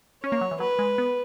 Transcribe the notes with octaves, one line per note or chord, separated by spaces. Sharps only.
C#4 C#5
A#3
F#3
E3
F#3 B4
G#3
B3